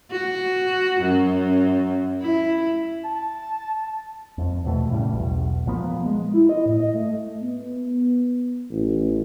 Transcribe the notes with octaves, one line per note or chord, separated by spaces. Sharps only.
F#4
F#2
E4
A5
F2
E2 B2 A3
A2 C#3 G3
B1 E2
A#2 F3 A#3 B3
G#3
E4
D#5
A2
D#5
A3
B3
A1